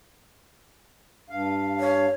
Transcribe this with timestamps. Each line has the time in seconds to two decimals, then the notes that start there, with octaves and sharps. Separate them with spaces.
1.30 G2 F5
1.80 C#5